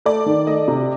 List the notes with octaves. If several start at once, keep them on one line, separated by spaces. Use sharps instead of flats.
A3 D5
D#3
A3 D#5
C3